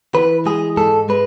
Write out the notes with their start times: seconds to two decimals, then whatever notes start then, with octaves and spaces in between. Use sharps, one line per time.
0.15 E3 B4
0.46 G#3 G#4
0.77 G#2 A4
1.09 G#3 B4